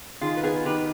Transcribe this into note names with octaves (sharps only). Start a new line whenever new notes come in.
D#3 F4 G#4
B4
B3 F4 G#4
D#3 G4 B4